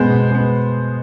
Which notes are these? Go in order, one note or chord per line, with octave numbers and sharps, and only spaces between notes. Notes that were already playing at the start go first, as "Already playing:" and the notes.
Already playing: B2 G#3 B3 C5
B2
G#3 B3